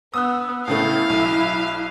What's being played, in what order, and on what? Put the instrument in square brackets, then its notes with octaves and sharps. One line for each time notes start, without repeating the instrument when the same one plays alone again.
[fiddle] B3 [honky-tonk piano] D#6 E6 F#6
[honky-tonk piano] A2 C#3 A3 [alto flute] E4 [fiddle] F5
[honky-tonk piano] B1